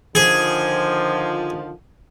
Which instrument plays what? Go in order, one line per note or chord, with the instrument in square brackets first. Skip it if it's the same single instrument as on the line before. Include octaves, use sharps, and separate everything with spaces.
[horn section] D3 D#3 F3 [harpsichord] G#4